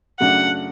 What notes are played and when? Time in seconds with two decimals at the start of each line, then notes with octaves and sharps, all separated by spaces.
0.20 F#2 C#3 F#3 A3 D4 F#5